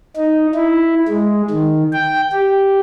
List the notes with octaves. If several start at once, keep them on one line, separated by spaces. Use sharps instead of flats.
D#4
E4
G#3
D#3
G5
G4